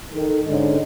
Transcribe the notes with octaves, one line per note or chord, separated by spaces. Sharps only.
D#3 A4
G#2 D3 G#3 C#4 D#4